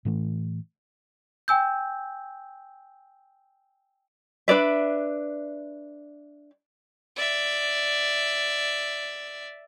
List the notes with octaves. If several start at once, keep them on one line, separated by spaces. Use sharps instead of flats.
A2 E3 A3
G5 G#5 E6 G6
D4 B4 D5 E5
D5 E5